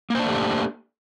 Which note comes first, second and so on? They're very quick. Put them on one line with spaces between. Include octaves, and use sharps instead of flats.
A#3 C5 D4 A3 G4